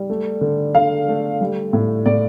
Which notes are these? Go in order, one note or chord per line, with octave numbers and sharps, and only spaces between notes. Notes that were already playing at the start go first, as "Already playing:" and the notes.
Already playing: G3
A3
D3
D3 F5
A3
G3
A2
A2 D5